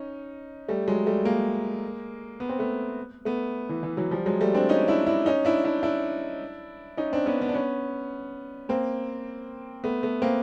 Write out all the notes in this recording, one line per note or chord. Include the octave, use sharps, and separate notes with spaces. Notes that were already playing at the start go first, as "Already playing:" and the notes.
Already playing: C#4 D#4
G3 A3
F#3 G#3
G3 A3
G#3 A#3
B3
C4
A3 B3
A3 B3
E3
E3
E3 F#3
F3 G3
F#3 G#3
G3 A3
C4 D4
C#4 D#4
D4 E4
D4 E4
C#4 D#4
D4 E4
D4 E4
D4 E4
C#4 D#4
C4 D4
B3 C#4
B3 C#4
D4
B3 C#4
A#3 C4
A3 B3
A3 B3
A#3 C4